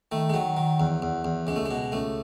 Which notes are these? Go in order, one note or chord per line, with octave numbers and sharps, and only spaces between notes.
D#3 A3
G#3
D#3 F#3
D#3
E2
E2
E2
C#2 G#3
A3
G#3
B2
C#2 A3